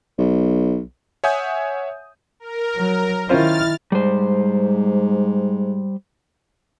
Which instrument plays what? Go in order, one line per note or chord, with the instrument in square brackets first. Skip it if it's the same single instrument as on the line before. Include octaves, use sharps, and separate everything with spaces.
[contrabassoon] B1
[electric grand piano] C#5 E5 F#5 G#5 D#6 G6
[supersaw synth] A#4
[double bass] F#3
[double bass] D#3 E4 [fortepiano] C#4 F4 C5 [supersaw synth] F6 A6
[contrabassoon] G#2 [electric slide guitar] G3 C5